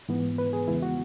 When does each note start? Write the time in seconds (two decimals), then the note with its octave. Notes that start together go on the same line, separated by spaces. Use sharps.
0.09 G#2 E3 B3
0.38 B4
0.53 G#4
0.68 E2 C#3 E3 G#3 B3 E4
0.82 F#4